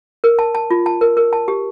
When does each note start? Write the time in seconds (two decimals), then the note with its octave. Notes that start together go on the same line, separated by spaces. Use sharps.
0.24 A#4
0.39 A5
0.55 A5
0.71 F4
0.86 A5
1.01 A#4
1.17 A#4
1.33 A5
1.48 G4